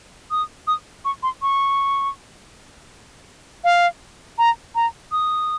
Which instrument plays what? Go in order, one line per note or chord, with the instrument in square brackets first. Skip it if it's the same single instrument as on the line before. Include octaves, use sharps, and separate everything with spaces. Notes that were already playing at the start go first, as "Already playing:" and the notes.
[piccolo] D#6
D#6
C#6
C6
C#6
F5
A#5
A#5
D#6